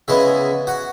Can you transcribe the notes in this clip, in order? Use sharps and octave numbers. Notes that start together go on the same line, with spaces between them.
C#3 G#3 B3 E4 E5
F#4 F#5